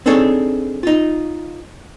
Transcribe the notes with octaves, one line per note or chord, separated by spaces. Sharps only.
C4 D4 D#4 G#4 A4 C#5
D#4 F4